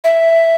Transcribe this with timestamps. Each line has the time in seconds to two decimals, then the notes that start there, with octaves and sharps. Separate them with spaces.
0.04 E5